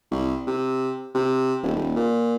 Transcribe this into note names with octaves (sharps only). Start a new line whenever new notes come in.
C2
C3
C3
D#1
D#1
A#2